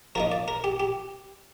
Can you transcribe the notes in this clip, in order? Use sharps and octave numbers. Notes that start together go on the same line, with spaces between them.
F3 A#3 D#4 A#4
D5
A#4
G4
G4